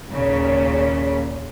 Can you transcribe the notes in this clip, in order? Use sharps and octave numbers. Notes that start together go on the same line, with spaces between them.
D#2 A#2 C#3